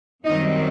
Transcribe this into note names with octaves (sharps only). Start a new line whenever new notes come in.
F#2 D#3 G3 C4 D#4 D#5